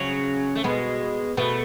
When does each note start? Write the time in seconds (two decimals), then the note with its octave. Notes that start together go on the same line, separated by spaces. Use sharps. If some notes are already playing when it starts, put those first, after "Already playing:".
Already playing: C#3 F#3 C#4
0.55 A3
0.64 B2 G#3 B3
1.37 B2 A3 B3